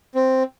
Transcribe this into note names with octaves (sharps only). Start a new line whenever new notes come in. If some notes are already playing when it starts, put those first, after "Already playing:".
C4